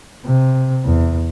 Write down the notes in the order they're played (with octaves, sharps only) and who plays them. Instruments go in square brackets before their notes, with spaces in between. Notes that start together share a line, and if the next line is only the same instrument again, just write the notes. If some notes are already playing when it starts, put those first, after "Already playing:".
[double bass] C3
E2